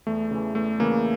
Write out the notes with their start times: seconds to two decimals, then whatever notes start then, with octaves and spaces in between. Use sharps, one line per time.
0.07 E2 A3
0.31 C#3 E3
0.55 E2 A3
0.80 C#3 E3 A#3